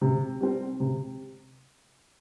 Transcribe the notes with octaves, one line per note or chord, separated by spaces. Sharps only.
C3
G3 C4
C3